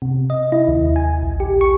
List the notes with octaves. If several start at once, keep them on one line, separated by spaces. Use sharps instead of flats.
C3
D#5
E4
D#2
G#5
A#1
G4
C#6